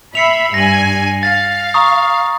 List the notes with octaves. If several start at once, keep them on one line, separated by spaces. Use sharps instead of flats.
E5 B5 C7 C#7 F7
G2 G#5 A#6 F#7
F5 A6
A#5 C#6 D#6